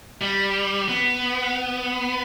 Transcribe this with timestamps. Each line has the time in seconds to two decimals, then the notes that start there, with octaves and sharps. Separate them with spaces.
0.21 G3
0.89 B3